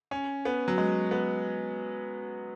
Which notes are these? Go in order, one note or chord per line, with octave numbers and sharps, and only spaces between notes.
C#4
B3
F#3
G#3
B3